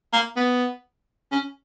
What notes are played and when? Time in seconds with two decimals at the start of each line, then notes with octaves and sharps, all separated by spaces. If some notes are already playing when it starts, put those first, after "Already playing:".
0.13 A#3
0.37 B3
1.32 C#4